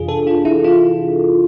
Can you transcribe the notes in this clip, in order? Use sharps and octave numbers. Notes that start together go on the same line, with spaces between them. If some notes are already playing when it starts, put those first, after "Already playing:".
Already playing: F2 C3 E3 D4 F4 G#4
A4
F4
E4
F4